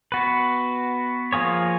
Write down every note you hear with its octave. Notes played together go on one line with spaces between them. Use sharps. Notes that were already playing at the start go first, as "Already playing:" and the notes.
B3 F#4 B4
F3 A#3 F4 G#4 C#5